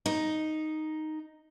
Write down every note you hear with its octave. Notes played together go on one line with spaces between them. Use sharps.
D#4